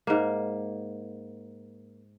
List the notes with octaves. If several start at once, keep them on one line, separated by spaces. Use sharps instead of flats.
G#2 A#3